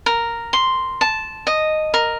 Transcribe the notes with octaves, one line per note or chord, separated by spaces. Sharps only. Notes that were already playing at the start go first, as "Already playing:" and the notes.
A#4
C6
A5
D#5
A#4